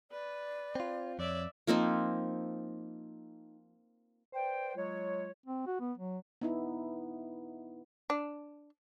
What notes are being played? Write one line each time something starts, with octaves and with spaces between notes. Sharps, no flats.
B4 D5
C4 F4
F2 C#5 D5 E5
F3 A#3 C4 D#4
B4 C5 D5 G5
F#3 G#3 F4 C#5
C4
F#4
B3
F#3
B3 D#4 E4
D4